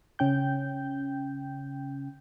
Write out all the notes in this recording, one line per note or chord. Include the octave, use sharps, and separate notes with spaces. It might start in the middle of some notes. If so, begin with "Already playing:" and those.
C#3 C#4 G5 G6